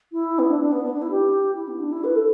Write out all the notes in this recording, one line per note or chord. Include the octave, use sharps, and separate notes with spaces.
E4
B3
D4
D4
B3
B3
D4
E4
G4
E4
B3
D4
E4
B4
A4